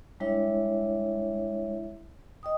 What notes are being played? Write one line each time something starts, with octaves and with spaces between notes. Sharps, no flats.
G3 G#3 D4 E4 C#5 E5
D#5 G5 D#6